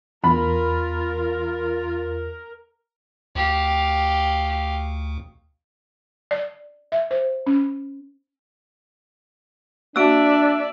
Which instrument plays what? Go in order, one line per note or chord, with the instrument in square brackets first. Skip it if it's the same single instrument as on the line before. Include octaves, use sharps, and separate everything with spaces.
[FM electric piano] E2 [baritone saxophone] F4 [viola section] A#4 [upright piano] B5
[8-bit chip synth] D2 [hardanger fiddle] G4 F5
[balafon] D5
E5
C5
C#4
[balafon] A#3 F#4 [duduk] D4 [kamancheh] D5 E5 [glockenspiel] E6 D7